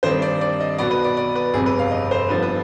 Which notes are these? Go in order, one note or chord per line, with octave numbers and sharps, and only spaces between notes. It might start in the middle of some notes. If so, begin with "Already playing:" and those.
G2 D#3 G3 C4 C5
D5
D5
D#5
B1 B2 B3 D5
B4
D5
D5
B4
G1 F2 C3 G#4
B4
F5
D#5
C5
G2 D3 F3 B3 B4
B4